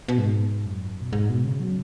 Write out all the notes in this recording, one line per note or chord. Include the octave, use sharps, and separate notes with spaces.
B2
G#2
F#2
B2
G#2
B2
C#3
F#3